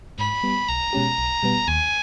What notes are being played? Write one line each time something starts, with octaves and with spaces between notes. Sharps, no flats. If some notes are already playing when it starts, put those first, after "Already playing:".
G#2 B5
G3 B3
B1 A#5
B2 G#3 C#4 G4
B1
B2 G3 B3
D#2 G#5